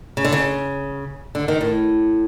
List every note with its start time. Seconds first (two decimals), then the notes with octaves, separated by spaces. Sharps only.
0.17 C#3
0.25 D3
0.32 C#3
1.35 D3
1.48 D#3
1.61 A2